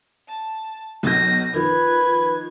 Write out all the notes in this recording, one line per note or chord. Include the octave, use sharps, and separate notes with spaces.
A5
B1 B2 G6 A#6
D#3 F3 B4 G#6